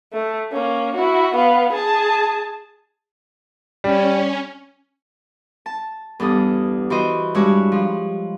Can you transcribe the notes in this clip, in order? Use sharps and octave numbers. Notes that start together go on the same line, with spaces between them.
A3
A#3 C#4
E4 F#4
B3 F5
G#4 A5
G3 C#4
A5
E2 G2 A4 D#6
E3 F#4 C5 D#5
G2 G#3 E4 F#4 C#5
F3